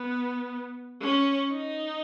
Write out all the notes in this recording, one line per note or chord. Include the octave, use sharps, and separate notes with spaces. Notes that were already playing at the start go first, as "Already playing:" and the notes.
Already playing: B3
C#4
D#4